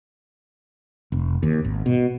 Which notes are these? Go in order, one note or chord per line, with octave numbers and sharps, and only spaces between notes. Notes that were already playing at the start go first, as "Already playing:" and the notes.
F1
D#2
G#1
B2